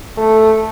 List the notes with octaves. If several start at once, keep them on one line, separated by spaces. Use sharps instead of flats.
A3